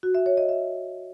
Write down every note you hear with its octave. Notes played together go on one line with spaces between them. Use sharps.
F#4
E5
C#5
D#5
E5